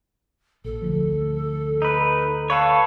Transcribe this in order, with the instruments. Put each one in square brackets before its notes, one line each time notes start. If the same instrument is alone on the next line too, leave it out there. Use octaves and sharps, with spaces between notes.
[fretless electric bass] A#1 [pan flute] A4
[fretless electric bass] D2 F3
[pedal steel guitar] D#4 B4
[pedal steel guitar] A4 B4 C#5 [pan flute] F5